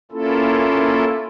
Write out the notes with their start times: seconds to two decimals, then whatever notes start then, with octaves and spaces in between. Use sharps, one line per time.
0.12 A#3 C#4 E4 F4 A4